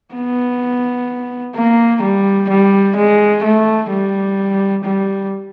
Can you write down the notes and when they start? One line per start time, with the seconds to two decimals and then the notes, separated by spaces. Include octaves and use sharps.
0.15 B3
1.56 A#3
2.03 G3
2.50 G3
2.97 G#3
3.44 A3
3.91 G3
4.84 G3